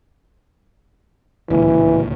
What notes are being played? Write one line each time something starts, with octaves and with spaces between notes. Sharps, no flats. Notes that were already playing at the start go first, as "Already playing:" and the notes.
D1 C#2 A#2 E3